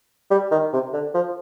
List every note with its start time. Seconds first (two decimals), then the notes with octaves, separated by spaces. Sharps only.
0.31 G3
0.51 D#3
0.73 C3
0.93 D3
1.14 F3